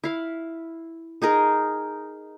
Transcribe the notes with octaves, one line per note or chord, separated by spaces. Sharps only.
E4 F5 B5
D#4 G#4 A#4 D#5